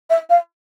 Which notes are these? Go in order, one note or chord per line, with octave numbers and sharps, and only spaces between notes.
E5
F5